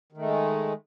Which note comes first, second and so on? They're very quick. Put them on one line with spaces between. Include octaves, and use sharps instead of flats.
D#3 A3 G#3